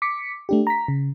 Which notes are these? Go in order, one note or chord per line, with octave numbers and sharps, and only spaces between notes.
D6 B6 C#7
A3 D4 G4
A#5 B6
C#3